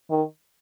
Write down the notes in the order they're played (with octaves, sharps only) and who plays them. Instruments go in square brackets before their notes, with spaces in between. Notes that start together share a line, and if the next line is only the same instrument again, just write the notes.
[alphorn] D#3